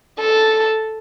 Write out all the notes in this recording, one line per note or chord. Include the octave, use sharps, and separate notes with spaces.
A4